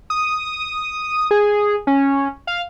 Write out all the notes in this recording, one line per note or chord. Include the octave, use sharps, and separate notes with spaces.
D#6
G#4
C#4
F5